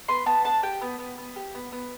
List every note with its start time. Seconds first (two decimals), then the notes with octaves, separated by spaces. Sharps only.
0.08 B3 C6
0.26 B3 A5
0.44 D4 A5
0.63 G4 G5
0.81 B3
0.99 B3
1.18 B3
1.36 G4
1.55 B3
1.72 B3